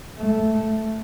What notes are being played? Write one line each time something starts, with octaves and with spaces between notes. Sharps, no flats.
A3